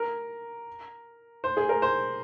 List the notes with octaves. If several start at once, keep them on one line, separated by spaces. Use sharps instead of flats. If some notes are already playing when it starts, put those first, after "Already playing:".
Already playing: A#4
C5
G#4
A#4
C5